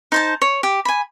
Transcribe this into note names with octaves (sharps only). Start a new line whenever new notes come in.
D#4 C5 A5
C#5
G4
G#5 B5